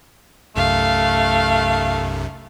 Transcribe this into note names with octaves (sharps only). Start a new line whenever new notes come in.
B1 F#2 C3 A3 F5